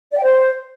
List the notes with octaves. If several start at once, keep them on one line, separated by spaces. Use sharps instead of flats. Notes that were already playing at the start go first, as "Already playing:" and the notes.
D5
G5
C5